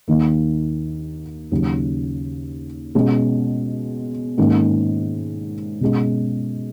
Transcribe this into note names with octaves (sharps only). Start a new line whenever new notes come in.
D#2 D#3 A#3
D#2 C#3 F#3
B2 G#3 C#4
G#2 D#3 A#3 C#4
B2 G#3 C#4